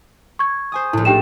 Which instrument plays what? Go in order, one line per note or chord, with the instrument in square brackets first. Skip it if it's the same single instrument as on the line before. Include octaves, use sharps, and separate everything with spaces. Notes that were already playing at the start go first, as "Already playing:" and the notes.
[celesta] C#6 G#6
[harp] C5 G#5 D#6
[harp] A#1 A2 [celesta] E4
[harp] A3 D4 D#4 [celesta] G4 G5 E7